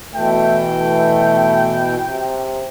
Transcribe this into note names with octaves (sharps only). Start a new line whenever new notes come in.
B2 E3 A3 G5
A3
C3